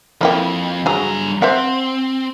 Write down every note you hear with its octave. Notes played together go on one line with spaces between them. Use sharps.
F2 A#3 E4 G5
G2 F#3 G#4 A#5
C4 C5 E5 F#5